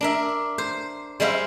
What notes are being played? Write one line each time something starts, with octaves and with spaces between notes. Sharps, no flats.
D4 A#4 E5
C5
G3 G#3 C5 E5 F5